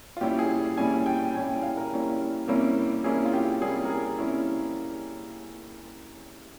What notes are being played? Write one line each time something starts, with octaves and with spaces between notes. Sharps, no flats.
F4
A#2 G3 C#4 E4 G4
G#4
A#2 G3 C#4 E4 G#5
G5
A#2 G3 C#4 E4 G#5
G5
F5
A#4
A#2 G3 C#4 E4
C3 G3 A#3 C#4 E4
C3 G3 A#3 C#4 E4 G#4
F4
G4
C3 G3 A#3 C#4 E4 G#4
A#4
G#4
C3 G3 A#3 C#4 E4